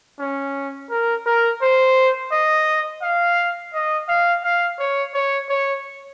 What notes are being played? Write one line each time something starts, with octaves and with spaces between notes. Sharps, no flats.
C#4
A#4
A#4
C5
D#5
F5
D#5
F5
F5
C#5
C#5
C#5